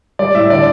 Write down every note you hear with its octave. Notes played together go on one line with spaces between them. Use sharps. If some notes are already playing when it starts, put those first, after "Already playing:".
G3 D5
A2 E5
D3 D5